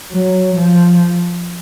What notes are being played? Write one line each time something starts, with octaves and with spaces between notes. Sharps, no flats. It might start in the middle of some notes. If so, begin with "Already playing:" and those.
F#3
F3